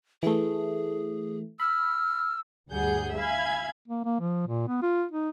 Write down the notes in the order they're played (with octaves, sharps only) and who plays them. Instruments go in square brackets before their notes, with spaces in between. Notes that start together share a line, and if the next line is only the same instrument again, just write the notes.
[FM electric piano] E3 A3 [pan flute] G#4
[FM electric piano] B5 [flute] E6 [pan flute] F6
[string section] D2 G2 G3 G#4 F#5 G6
E5 F5 G#5 B5 G#6
[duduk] A#3
A#3
F3
A#2
B3
F4
D#4